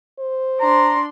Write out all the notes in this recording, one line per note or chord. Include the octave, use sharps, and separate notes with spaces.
C5
D4 A#5 C6